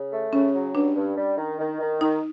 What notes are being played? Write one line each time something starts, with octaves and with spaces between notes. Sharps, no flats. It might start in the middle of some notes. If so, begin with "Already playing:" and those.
Already playing: C#3
A3
C#3 C#4
F#3
G2 D4
G2
G3
D#3
D#3
D#3
D#3 D#4